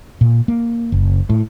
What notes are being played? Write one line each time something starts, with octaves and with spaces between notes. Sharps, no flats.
A#2
A#3
F#1
A2